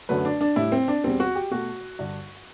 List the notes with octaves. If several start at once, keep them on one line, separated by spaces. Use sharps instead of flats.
F#2 D3 F#3 A3 B4
D4
D4
A2 G3 E4
C4
D4
E2 B2 G3 C4
F#4
G4
B2 A3 F#4
G2 D3 G3